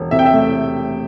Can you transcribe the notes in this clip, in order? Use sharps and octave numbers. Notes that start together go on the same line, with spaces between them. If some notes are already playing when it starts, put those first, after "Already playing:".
Already playing: E1
C3 E5
G5
E5
A3